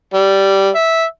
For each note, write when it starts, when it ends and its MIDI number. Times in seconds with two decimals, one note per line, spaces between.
0.14 0.68 55
0.75 1.03 76